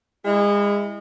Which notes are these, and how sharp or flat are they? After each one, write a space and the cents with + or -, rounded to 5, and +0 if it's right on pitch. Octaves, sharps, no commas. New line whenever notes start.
G#3 -30 E4 +0